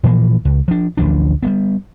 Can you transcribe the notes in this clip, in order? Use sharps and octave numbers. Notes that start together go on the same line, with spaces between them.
A#2 E3 F3 A#3
C#2
F3 D4
A1 D2 F3 D4
G3 A3 B3